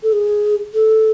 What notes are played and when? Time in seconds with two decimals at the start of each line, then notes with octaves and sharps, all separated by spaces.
0.03 A4
0.12 G#4
0.74 A4